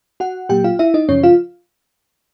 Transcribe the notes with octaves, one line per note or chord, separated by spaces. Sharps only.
F#4 F#5
A#2 F#3 A#3 G4 G5
F4 F5
E4 E5
D#4 D#5
F#2 C#3 F3 C#4 C#5
F4 F5